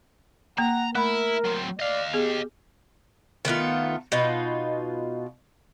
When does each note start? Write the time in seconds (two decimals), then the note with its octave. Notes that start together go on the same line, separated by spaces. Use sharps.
0.58 A#3 F#5 A#5
0.95 A3 E4 A#4 B5
1.44 F#3 C4
1.80 D5 D#5 F5
2.14 B3 G4 G#4
3.45 D#3 A3 B3 F4
4.12 B2 D#4 F4 B4